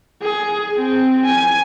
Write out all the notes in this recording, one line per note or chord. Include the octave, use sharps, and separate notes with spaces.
G#4
C4
G#5